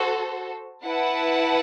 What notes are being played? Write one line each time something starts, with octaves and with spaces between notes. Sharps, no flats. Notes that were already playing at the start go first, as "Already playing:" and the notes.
Already playing: F#4 A4 C5
E4 B4 F#5 A5